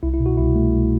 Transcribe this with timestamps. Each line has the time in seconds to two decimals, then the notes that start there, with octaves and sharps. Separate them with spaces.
0.03 C2 E4
0.14 E4
0.20 B2
0.26 F#4
0.37 C2 E4
0.55 A3
0.73 C2